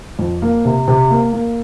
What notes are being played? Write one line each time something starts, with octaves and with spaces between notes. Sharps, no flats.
F2
A#3
C3
C3
A#3
A#3